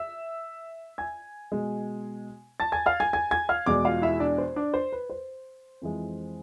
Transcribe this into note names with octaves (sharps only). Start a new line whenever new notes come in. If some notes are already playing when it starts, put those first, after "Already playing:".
Already playing: E5 E6
G#5 G#6
B2 G#3
A5 A6
G#5 G#6
F5 F6
G#5 G#6
G#5 G#6
G#5 G#6
F5 F6
E2 B2 G#3 D5 D6
F4 F5
E4 E5
D4 D5
C5
D4 D5
C5
B4
C5
F2 E3 G#3